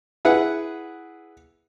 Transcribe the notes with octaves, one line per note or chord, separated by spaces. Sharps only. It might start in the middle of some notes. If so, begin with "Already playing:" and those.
E4 G#4 B4 F#5